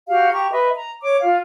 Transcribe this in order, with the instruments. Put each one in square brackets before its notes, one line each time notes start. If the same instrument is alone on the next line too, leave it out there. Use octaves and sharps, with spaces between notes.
[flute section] F#4 G4 F5
G4 A#5 C#6
B4 D#5 E5
A#5
C#5 D6
F4 F5